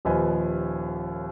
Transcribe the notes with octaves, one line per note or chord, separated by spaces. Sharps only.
D#1 D#2 F3 B4 D#5 G#5